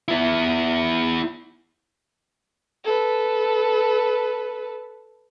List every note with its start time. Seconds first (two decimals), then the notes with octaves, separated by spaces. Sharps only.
0.08 B3 E4
2.85 A4 B4